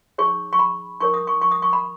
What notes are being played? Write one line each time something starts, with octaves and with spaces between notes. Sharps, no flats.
D#4 G#4 C#5 C#6
C#6
B5
D#4 A#4 C#5 C#6
D#6
C#6
C#6
D#6
C#6
B5